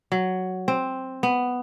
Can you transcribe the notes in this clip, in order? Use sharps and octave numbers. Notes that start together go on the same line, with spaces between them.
F#3
C4
B3